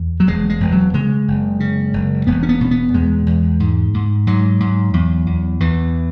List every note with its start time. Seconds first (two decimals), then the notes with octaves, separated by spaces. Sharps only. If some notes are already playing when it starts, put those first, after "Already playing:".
Already playing: E2
0.20 F#3
0.27 E1 G#3
0.50 G#3
0.60 E1
0.72 F#3
0.94 C#3 G#3
1.28 F#1
1.60 C#3
1.94 F#1
2.27 E1 B3
2.43 C#4
2.49 B3
2.61 B2 C#4
2.71 B3
2.94 E2 G#3
3.26 E2
3.60 G#2
3.94 G#2
4.27 G#2 F#3
4.60 G#2
4.93 E2
5.27 E2
5.60 E2 E3